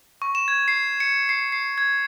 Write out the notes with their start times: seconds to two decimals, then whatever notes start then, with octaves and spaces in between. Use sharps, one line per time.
0.22 C#6
0.35 E7
0.48 G#6
0.68 C7
1.00 C#7
1.29 C7
1.52 C7
1.78 G#6